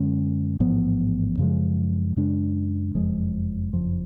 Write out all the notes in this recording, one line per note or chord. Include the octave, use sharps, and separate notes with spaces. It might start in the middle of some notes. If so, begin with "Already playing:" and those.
Already playing: F#2 D3 G#3 C#4
A1 G#2 F3 B3
F#2 C#3 F3 G#3
F#2 C#3 G#3 D4
F#1 F2 F3 G#3
F#1 F2 F3